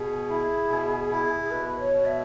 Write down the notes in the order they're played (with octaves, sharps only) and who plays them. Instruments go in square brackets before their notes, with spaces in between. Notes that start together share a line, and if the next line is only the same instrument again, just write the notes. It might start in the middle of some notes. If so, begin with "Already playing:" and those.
Already playing: [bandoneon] B2 [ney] G#4
[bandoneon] E4
B2
E4
[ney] G#4
[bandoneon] B2 [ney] B4
[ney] C#5
[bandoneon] B2
[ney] E5